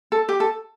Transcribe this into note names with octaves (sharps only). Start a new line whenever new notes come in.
A4
G4
A4